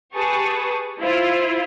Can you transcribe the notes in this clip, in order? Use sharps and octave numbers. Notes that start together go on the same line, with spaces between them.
G4 G#4 B4 A5 C#6 D#6
E4 F4 C5